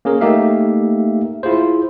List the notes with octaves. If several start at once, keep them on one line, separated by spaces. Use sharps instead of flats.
A#3 C#4 G#4 A#4
A3 A#3 D#4 G4 E5 F5
E4 F4 G#4 C5